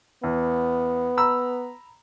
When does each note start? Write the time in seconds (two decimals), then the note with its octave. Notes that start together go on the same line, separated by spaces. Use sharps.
0.24 E2 B3
1.17 A#5 B5 E6